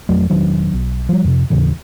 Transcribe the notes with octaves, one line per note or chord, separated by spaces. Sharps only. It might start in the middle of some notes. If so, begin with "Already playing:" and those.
F2 F#3 A3
E1 D#3 F#3 D4
B1
F3 G3
F2 C3
D#2 A2 C#3 E3